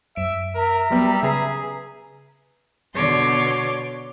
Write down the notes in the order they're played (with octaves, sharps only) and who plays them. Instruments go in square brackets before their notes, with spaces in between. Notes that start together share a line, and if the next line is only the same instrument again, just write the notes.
[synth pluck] F#2 D7 [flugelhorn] E5
[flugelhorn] A#4 [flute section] E5 A#5
[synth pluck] F#3 B3 [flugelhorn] G3
[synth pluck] C#3 B4 C7 [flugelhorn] G#4
[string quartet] B2 D3 C#5 C6 D6